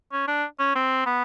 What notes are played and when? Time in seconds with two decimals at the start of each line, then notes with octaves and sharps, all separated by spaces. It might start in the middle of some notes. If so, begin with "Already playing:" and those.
0.13 C#4
0.28 D4
0.60 C#4
0.76 C4
1.06 B3